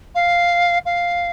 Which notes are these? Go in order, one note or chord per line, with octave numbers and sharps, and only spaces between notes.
F5
F5